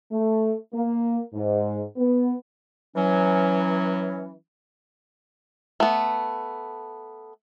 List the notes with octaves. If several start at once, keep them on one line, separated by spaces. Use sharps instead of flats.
A3
A#3
G#2
B3
E3 F#3 C#4
A3 B3